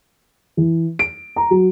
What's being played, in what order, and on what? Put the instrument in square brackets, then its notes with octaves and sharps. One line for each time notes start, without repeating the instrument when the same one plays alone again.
[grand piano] E3
D7
A#5
F#3